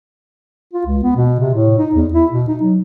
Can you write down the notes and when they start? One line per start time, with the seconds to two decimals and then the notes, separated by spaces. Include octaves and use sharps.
0.73 F4
0.86 C#2
1.04 B3
1.16 B2
1.40 C3
1.54 A2
1.78 D#4
1.95 E2
2.13 E4
2.32 B2
2.48 D#4
2.62 F#3